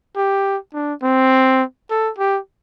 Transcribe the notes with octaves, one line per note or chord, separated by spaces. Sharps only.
G4
D4
C4
A4
G4